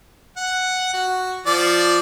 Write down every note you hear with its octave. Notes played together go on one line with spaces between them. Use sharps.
F#5
F#4
F3 D5